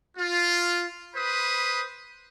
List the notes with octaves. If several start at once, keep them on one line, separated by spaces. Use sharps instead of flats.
F4
B4 C5 B5 D#6